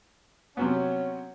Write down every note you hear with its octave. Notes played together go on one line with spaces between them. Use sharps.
C3 F#3 B3 C#4